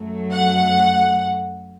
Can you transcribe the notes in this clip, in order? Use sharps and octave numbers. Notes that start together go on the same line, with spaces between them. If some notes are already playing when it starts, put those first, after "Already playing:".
Already playing: F#2 F#3 A3
F#5